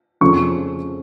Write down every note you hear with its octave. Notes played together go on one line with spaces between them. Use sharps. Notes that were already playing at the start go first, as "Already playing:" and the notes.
F2 C#3 F3 A3 C#4 C#6